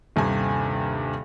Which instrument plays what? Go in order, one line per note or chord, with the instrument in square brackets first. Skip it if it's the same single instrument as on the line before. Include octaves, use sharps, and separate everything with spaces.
[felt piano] D#1 G2 C3 G#5